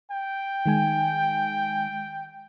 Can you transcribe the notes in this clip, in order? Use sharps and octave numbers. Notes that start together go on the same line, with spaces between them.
G5
D#3 G#3 G#5